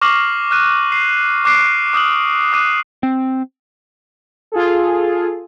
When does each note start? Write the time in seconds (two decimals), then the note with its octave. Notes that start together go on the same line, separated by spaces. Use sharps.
0.01 C#6 D6 F6 A#6 C7 F#7
0.51 F6 F#6 D#7
0.92 C7
1.44 C#6 D6 F6 F#6 C7 D7
1.93 D6 D#6 F6 F#6 F#7
2.53 D6 F#6 D#7
3.03 C4
4.52 F4 G#4 A4